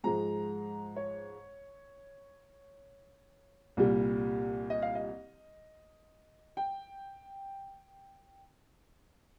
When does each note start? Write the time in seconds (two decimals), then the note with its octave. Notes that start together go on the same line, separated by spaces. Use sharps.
0.04 G#2 F3 G#3 A#5
0.96 C#5
3.77 C2 A#2 G3
4.70 D#5
4.82 F5
4.95 D#5
6.57 G5